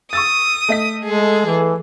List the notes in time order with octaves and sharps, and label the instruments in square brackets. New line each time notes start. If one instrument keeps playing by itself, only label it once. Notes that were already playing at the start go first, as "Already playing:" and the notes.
[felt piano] C#6 E6 A6 [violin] D#6
[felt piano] A3 D#5 B6
[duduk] G#3 [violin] G#4 A4
[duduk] E3